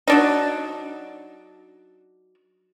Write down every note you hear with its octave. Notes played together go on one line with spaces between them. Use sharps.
F#3 D4 D#4